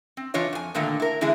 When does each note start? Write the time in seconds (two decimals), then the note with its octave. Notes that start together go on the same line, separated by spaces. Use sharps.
0.17 C4
0.34 E3 D4 F4 C#5 D#5
0.53 F2 G#5
0.75 A#2 D3 D#3 A3 A#3 D4
1.00 E4 A#4
1.21 D3 E3 G#3 E4 G#4